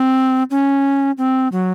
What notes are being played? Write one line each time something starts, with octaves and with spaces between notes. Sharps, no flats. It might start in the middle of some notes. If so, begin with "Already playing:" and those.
Already playing: C4
C#4
C4
F#3